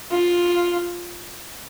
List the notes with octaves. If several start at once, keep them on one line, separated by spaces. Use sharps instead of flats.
F4